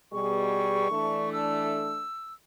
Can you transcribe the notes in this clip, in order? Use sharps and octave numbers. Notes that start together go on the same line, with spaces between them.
B2 G3 G#4 C#6
E3 A3 D4
E6